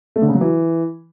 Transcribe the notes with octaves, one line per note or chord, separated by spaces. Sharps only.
A3
D3
C#3
F#3
E3